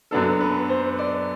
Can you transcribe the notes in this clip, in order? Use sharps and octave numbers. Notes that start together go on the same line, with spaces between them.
F#2 F#3 B3 D4 A4
B4
C5
D5